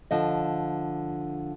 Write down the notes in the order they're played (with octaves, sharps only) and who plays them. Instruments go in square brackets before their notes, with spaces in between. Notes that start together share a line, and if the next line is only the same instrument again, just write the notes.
[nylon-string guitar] D3 F3 D#5